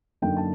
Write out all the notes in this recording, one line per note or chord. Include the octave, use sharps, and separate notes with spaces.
F#2 D3 F#3 A#3 D#4 G5
A5